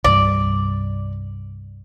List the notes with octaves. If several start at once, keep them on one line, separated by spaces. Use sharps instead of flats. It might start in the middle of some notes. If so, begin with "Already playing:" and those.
C2 G2 G3 D5